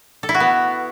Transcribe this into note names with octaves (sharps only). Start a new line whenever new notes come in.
A4
E4
F#4
B3